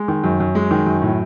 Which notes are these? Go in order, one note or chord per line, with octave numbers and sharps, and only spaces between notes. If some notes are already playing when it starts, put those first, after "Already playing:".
Already playing: G#3
D#3
F#2
F#2
G#3
D#3
F#2
A2